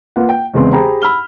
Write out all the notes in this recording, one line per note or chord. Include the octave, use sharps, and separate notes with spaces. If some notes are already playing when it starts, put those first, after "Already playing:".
A#3 F4 B4 F#5
G5
E2 C#3 G#3 B3 C4 C6
G4 G#4 C5 G5 A#5 B5
B5 E6 F6 G7